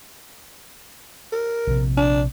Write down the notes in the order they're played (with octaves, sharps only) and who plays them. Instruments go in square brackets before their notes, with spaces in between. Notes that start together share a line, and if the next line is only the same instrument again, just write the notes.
[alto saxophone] A#4
[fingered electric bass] A#1 C3
[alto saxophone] D4